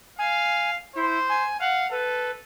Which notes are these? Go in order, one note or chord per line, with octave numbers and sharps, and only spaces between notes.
F5 G#5
E4 C5
G#5
F5 F#5
A4 B4